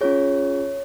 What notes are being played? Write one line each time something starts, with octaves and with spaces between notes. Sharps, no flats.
C#4 F4 G#4 C#5